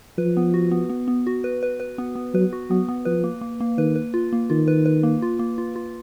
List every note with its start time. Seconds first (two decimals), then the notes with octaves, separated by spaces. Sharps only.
0.18 F3 B4
0.37 B3
0.54 F#4
0.71 B3
0.89 B3
1.08 B3
1.27 F#4
1.44 B4
1.63 B4
1.80 B4
1.98 B3
2.15 B3
2.34 F#3 B4
2.53 F#4
2.70 F#3 B3
2.89 B3
3.05 F3 B4
3.24 A#3
3.41 A#3
3.60 A#3
3.78 D#3 B4
3.96 B4
4.14 F4
4.33 A#3
4.50 D#3 F4
4.68 B4
4.86 B4
5.03 A#3
5.22 F4
5.39 A#3
5.58 F4
5.76 F4